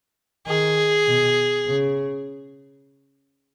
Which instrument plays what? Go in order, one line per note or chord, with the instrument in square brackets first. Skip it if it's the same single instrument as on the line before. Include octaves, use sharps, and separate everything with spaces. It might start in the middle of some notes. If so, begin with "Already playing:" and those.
[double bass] D#3 [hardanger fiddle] G#4
[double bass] B2
C#3